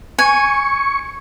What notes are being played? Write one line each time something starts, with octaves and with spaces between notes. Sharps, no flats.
G#5 C#6